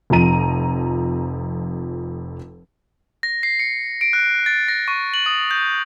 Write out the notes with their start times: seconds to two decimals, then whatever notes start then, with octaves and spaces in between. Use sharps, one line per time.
0.10 F1 F2 F3 A#5 D#7
3.23 A#6
3.43 C7
3.59 C#7
4.01 D7
4.13 F#6
4.46 A6
4.68 A#6
4.88 C#6
5.14 F#7
5.26 D#6
5.51 G6